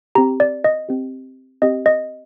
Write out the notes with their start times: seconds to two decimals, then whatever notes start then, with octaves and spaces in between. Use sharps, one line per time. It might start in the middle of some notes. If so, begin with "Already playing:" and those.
0.15 C4 G4 A#5
0.40 D5
0.64 D#5
0.89 C4 G4
1.62 C4 G4 D#5
1.86 D#5